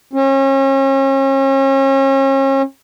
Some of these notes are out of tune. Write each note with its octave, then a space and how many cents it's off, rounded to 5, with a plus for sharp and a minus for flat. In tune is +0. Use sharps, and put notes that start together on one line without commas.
C#4 -40